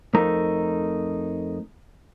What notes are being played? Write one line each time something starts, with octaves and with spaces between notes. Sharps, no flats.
F2 A3 D#4 A#4 A#5